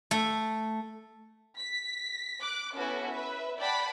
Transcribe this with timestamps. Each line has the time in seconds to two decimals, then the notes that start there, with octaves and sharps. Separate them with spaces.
0.11 A3
1.58 B6
2.41 D6 F#6
2.76 B3 C#4 E4 F#4 A4 B4
3.10 B4 E5
3.59 D5 F#5 G5 A5 B5